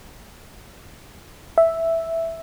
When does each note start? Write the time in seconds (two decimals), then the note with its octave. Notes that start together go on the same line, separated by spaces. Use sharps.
1.58 E5